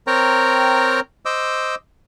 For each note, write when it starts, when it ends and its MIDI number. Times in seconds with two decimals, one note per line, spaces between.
0.07 1.00 60
0.07 1.00 70
0.07 1.00 73
0.07 1.00 79
0.07 1.00 82
1.26 1.75 72
1.26 1.75 75
1.26 1.75 86
1.26 1.75 88